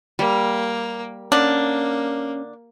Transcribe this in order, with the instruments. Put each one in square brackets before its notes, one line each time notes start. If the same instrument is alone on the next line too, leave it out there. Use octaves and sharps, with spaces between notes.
[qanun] G3 [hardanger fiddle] A#3
[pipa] D3 D4 [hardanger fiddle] A#3 [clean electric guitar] C#4